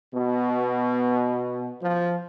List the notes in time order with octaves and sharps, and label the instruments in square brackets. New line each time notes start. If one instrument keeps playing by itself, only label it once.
[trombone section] B2
F3